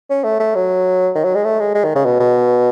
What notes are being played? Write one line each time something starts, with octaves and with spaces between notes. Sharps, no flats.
C#4
A3
A3
F#3
D#3
F#3
G#3
A3
G#3
G#3
D#3
C#3
B2
B2